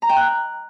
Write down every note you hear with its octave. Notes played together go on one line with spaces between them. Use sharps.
A#5
G5
F#6